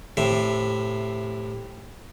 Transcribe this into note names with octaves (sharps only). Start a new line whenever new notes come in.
A2 C3 E5